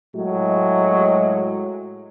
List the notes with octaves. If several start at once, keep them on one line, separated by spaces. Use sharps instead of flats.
A2 F#3 G#3